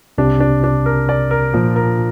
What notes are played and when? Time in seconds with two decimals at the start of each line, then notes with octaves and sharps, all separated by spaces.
0.18 C2 C3 D4
0.40 D4
0.64 D4
0.86 A#4
1.09 D5
1.31 A#4
1.54 A#2 F3
1.76 A#4